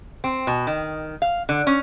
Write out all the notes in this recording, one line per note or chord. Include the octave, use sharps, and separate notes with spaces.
C4
B2
D#3
F5
D3
C#4